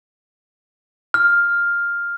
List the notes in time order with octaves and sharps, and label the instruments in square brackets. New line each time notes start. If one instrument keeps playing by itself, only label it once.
[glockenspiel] F6